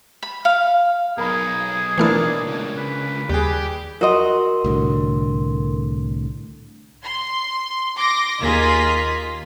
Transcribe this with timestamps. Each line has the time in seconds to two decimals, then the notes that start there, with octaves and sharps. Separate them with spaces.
0.23 B5
0.45 F5
1.18 B1 D#4 G#4 A#4 B5
1.98 A#2 E3 A3 A#3 D4 E4
2.47 C#2
2.77 B4
3.29 D#2 G3 G4 G#4
4.01 F#4 A#4 D#5 C6
4.64 C2 A2 D3
7.04 C6
7.98 C6 D6 A#6
8.41 D#2 A#3 F4 G#4 D#5 B6